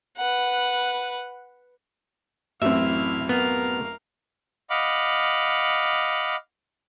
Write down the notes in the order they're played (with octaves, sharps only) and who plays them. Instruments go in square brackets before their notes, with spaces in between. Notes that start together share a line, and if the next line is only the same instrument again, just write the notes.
[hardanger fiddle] B4 F#5
[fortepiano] A1 F#2 C4 [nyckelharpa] E4 F5 [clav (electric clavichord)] E5
[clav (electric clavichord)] B3 [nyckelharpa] A#4 F5
[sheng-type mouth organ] D#5 F5 F#5 B5 D6